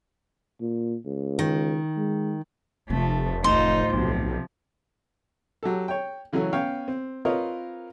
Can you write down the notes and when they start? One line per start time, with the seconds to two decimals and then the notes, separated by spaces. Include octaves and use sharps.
0.61 A#2
1.06 C#2
1.39 D#3
1.97 G#3
2.90 F1 C3 F3 A3
3.44 A1 D2 D#4 F4 C5
3.94 B1 C3 F3
5.63 F#3 G4 A4
5.88 C#5 G5
6.33 C#3 E3 F#3 A3 C#4
6.53 B3 C#4 C#5 F5 G5
6.88 C4
7.25 C4 F4 A#4 B4 C#5 D#5